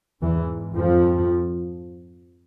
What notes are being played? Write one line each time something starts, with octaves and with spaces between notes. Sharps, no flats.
E2 G#2 E3
F2 F3